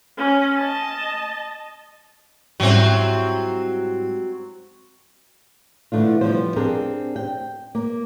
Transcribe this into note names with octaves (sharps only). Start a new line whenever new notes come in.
C#4
D#5 A5
G#2 F#3 G3 C4 E4
D3 E3 A3 D4 F4
F3 G3 B3 C5
C4 D4 G4 G#4 A#4
G5
A#3